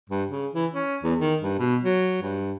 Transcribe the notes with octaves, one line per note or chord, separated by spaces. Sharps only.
G2
C#3
E3
C#4
E2
D#3
G2
B2
F#3
G2